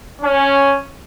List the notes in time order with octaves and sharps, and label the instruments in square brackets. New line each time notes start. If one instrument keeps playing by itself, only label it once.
[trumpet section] C#4